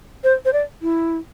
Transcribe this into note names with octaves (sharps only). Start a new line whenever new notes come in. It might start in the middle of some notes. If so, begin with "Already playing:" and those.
C5
C5
D5
E4